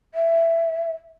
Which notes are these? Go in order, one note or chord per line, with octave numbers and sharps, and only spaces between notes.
E5